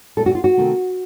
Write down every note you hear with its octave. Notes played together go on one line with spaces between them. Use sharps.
A#2 A3 A4
F#4
F4
F#4
C3 D#3 A3